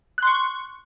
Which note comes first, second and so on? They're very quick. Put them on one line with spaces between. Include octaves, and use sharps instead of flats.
F#6 C6 C#6